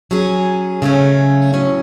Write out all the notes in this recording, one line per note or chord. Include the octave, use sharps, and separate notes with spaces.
F#3 C#4 G#4
C#3 F#3 A3 C#4
A2 F#3 C#4